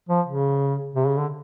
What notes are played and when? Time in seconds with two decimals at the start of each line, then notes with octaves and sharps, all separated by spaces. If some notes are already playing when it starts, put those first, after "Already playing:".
0.09 F3
0.27 C#3
0.96 C3
1.07 C#3
1.19 D3